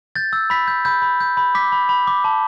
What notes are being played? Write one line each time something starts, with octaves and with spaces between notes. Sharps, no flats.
G6 A6
E6
B5 B6
G6
B5 G6
B5
G6
B5
D6 B6
B5
B5
D6
A5